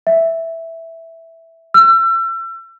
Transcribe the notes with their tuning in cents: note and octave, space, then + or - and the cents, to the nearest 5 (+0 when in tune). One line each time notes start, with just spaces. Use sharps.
E5 -5
E6 +35